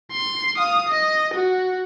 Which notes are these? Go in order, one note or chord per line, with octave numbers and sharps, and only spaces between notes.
C6
F5 D#6
D#5
F#4